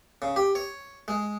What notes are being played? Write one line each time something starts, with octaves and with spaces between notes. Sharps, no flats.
C#3
G4
C#5
G#3